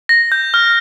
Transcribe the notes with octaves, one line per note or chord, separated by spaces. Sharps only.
A#6
G6
F6